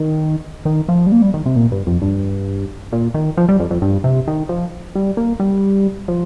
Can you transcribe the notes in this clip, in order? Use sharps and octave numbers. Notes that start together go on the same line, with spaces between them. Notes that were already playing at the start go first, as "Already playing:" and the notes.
Already playing: D#3
D#3
F3
G3
A#3
G3
D#3
C3
A#2
G2
F2
G2
A#2
D#3
F3
G3
F2
F2
G2
C3
D#3
F3
G3
A#3
G3
F3